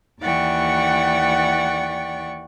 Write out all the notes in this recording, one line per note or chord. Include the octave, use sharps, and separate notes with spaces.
D#2 E3 D5 F#5 G5 C#6